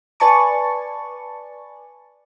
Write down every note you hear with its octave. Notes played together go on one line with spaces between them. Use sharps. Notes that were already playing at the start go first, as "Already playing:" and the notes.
B4 D5 G#5 A5 C#6